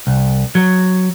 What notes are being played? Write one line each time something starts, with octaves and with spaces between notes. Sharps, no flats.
C2
F#3